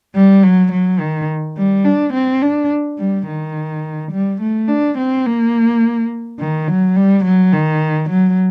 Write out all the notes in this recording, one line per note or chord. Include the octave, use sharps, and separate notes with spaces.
G3
F#3
F#3
D#3
G3
D4
C4
D4
G3
D#3
G3
A3
D4
C4
A#3
D#3
F#3
G3
F#3
D#3
F#3